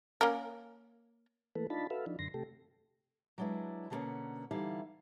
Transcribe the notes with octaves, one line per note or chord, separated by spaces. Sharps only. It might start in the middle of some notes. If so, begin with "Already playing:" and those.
A#3 C#4 A#4
E3 A3 A#3 A4 B4
D4 D#4 F4 A5 B5
F#4 A4 B4 E5 F5
F3 D4 D#4
F#2 D3 C6 A#6
C3 A3 G4 A4
F#3 G#3 D4 E4 B4
B2 D3 G3 A#3 B3 C#4
D3 E3 G3 D#4 E4 F5